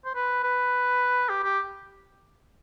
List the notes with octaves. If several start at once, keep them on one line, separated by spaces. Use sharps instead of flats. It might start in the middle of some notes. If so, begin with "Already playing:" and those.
C5
B4
B4
G4
G4